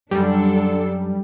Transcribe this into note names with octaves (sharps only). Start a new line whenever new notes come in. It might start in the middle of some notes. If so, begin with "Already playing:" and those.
F#2 D3 G3 D4 A4